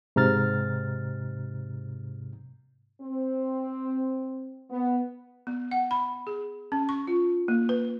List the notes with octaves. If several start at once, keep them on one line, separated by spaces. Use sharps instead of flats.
G#2 C3 A#5 F6 A6
C4
B3
B3
F#5
B5
G#4
C#4
C#6
F4
A#3
B4